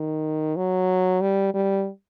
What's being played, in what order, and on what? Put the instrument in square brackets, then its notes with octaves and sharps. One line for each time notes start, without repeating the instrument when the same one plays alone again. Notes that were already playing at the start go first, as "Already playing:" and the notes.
Already playing: [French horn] D#3
F#3
G3
G3